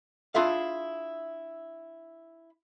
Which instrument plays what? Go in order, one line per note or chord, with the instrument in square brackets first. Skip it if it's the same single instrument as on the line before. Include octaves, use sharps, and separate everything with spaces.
[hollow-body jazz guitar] D4 E4 F4 G#4 E5 F5